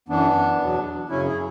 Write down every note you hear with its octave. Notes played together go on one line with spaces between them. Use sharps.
F#2 E3 B3 D4
E2 B2 F#3
F#2 C#3 F#3 C#4 E4
E4 G#4